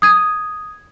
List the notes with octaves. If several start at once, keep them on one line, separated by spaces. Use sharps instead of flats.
D#6 G#6 D#7